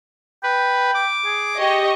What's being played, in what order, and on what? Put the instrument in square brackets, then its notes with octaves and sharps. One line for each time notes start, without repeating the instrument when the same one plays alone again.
[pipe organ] B4 [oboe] G5
[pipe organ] D6
[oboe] G#4
[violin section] G4 D#5 C#6